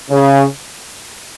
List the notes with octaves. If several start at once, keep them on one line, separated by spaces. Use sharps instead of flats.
C#3